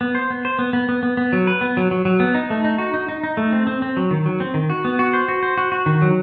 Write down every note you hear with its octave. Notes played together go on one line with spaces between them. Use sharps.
B3
C5
B3
C5
B3
B3
B3
B3
B3
F#3
B4
B3
F#3
F#3
F#3
B3
D#4
A3
D#4
F#4
D#4
D#4
D#4
A3
C4
C4
C4
F#3
D#3
F#3
C4
D#3
F#4
B3
F#4
C5
F#4
C5
F#4
F#4
D#3
F#3